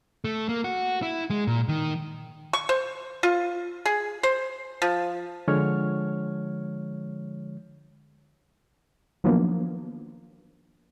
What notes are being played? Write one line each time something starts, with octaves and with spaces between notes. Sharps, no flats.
A3
A#3
F#4
E4
G#3
A#2
D#3
C#6
C5
F4
G#4
C5
F3
D3 F3 G#3 C#5 F6
D#3 F3 F#3 A#3 B3 D4